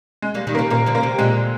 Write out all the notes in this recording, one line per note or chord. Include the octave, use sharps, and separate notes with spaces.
G#3
G3 A#3
D#3 G3
A#3
C3
A#2 A#3
D3 F3
A#3
C3
A#2 D3 G#3